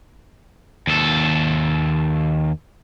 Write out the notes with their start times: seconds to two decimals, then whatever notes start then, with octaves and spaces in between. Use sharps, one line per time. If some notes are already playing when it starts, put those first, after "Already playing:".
0.87 D#2 A4